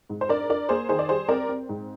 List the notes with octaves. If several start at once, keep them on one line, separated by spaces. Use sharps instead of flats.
G#2
C5
D4 A#4 D5
D4 A#4 D5
A#3 G#4 C5
D#3 G#4 C5
D5
G3 G#4 C5
C4 A#4 D5
C4
G#2